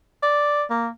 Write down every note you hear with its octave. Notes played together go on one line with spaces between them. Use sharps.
D5
A#3